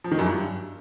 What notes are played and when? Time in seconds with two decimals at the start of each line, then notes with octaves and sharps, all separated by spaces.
0.04 F3
0.11 D#3
0.19 F#2
0.26 G2